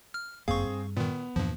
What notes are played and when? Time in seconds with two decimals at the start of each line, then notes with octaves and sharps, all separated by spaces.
0.14 F6
0.48 G1 F#2 A#3 C4 G#4 F5 C#6
0.65 G2
0.96 A#2 D#3 B3
1.36 E2 G2 A#2 F3